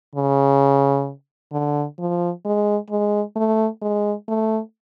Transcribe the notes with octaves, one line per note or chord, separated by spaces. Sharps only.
C#3
D3
F3
G#3
G#3
A3
G#3
A3